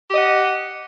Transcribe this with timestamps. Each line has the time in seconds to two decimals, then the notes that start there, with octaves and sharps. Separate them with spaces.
0.10 G4
0.13 D#5
0.17 F#5